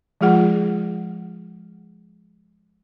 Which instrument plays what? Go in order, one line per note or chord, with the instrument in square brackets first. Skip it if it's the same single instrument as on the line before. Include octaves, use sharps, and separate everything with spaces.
[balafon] F3 G#3 F4 G#4 F#5